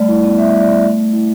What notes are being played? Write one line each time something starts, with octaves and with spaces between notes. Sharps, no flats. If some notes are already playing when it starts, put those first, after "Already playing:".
Already playing: G3 A3 D5
E4
B3
G3 E5
G3
D5
E4
A3
A3
E4